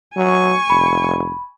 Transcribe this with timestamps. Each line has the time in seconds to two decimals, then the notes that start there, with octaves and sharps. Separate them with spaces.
0.17 F#3 G#5 C#6
0.70 F1 B5